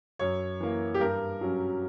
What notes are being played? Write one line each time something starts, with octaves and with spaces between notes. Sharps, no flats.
F#2 C#5
E3 A#3
G4
G2 A#4
F#3 C#4